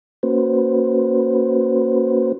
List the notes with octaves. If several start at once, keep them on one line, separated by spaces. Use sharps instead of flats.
A#3 C#4 F#4 B4 C5